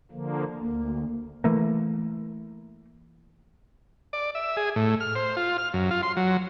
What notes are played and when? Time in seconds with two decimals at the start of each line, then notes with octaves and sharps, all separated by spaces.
0.11 D3 F3 A#3
0.61 D2 A#3
1.44 E3 A3 A#3
4.13 D5
4.35 E5
4.57 G#4
4.76 A2
5.00 F6
5.15 C5
5.37 F4
5.58 F6
5.74 F#2
5.91 F4
6.03 C6
6.17 F#3